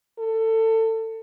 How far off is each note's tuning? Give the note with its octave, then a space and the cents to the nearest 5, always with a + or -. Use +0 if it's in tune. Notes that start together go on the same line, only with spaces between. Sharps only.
A4 +25